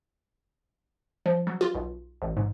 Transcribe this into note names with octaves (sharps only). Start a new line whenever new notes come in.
F3
F#3
F4
B1
A1
G#2